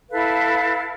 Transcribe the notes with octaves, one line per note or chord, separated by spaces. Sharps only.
E4 A4 B4 F5